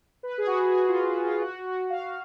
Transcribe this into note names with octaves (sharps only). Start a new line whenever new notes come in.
B4
G#4
F#4
G#4
F4
F#4
F4
F#4
F#4
F5